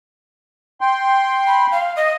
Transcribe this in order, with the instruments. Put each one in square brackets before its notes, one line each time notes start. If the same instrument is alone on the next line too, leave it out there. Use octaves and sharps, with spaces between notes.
[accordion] G5 C6
[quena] B5
F5
D#5